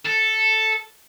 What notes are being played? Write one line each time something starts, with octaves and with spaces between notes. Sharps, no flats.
A4